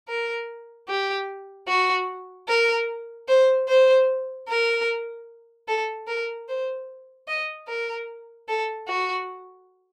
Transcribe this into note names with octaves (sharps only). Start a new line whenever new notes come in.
A#4
G4
F#4
A#4
C5
C5
A#4
A4
A#4
C5
D#5
A#4
A4
F#4